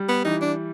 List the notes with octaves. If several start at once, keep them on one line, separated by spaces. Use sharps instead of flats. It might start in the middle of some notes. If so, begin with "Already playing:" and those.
Already playing: G3
B3
E3 D#4
D4